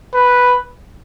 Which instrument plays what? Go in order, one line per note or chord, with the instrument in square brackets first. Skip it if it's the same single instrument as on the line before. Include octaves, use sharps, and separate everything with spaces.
[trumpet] B4